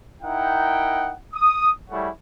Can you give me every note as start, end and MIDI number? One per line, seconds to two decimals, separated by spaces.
0.22 1.13 63
0.22 1.13 64
0.22 1.13 70
0.22 1.13 78
0.22 1.13 79
1.34 1.71 87
1.90 2.09 55
1.90 2.09 57
1.90 2.09 64
1.90 2.09 68
1.90 2.09 73
1.90 2.09 78